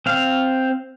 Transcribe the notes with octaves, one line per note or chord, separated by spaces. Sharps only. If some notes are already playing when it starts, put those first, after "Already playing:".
C4 F5